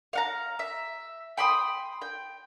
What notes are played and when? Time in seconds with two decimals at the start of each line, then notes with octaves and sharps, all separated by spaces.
0.13 F5 F#5 A#5
0.59 E5
1.37 G5 B5 C6 D#6
2.01 G5